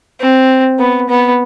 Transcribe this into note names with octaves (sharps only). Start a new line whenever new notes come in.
C4
B3
B3